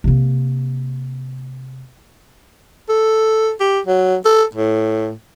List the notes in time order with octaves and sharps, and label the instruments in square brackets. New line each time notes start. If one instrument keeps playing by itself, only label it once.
[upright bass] C3 A#3
[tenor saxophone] A4
G4
F#3
A4
A2